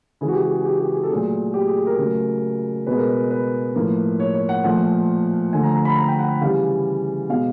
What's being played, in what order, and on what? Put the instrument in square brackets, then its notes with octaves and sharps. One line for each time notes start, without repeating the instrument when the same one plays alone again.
[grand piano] C#3 E3 G#3 G#4
F#4
G4
G4
G#4
G4
G4
G#4
A4
A#2 F#3 A3 G#4
G4
G#4
G#4
A#4
C#3 F#3 A3
B2 G#3 B4
A#4
B4
B4
A2 F3 A#3
C#5
C#5
F#5
A#2 F3 A3 F#5
D3 F3 A3 G#5
A#5
A#5
B5
A#5
G5
F#5
C#3 E3 G3 F5
B2 G#3 F5